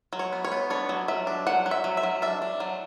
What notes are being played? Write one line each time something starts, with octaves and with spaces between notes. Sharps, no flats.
F#3
C#5
B3
C#5
B3
D4 C#5
F#3
F#3 E5
D4
F#3 F#5
F#3
E5
F#3
E5
F#3
D4 E5
D4
F#3